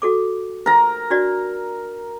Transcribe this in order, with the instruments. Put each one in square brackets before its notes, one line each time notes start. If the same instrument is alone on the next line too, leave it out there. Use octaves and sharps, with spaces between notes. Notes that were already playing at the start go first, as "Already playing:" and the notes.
[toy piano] F#4 A4 D6
[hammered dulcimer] A#4 A#5
[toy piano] D4 F#4 D5